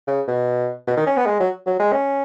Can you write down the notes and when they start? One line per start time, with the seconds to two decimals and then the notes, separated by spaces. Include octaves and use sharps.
0.08 C#3
0.28 B2
0.87 B2
0.97 D#3
1.07 C#4
1.17 B3
1.26 G#3
1.40 F#3
1.66 F#3
1.80 G#3
1.92 C#4